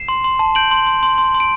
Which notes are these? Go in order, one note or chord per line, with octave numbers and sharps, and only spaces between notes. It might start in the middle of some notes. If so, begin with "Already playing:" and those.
Already playing: C7 E7
C6
C6
A5
G6 D7 F#7
C6
C6
C6
C6
C6
D7